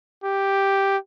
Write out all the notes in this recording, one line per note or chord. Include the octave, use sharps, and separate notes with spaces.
G4